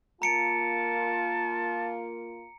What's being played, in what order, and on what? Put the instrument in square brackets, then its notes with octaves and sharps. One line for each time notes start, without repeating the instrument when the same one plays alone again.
[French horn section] A#3 F4 [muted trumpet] A5 [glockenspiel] A#5 C#7 D7